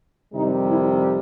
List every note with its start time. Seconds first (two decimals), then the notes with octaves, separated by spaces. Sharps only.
0.33 F2 C3 D#3 G3 D#4
0.65 E4